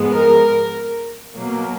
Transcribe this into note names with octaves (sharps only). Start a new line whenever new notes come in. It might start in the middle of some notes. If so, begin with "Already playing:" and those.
Already playing: G#2 F3 G#3 B3
A#4
B2 F#3 A#3